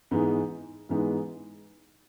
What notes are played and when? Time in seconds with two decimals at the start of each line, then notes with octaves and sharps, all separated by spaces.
0.11 G#2 E3 G#3 B3 D#4
0.89 G#2 E3 G#3 B3 D#4